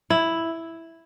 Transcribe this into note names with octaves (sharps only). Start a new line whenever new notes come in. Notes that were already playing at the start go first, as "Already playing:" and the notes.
E4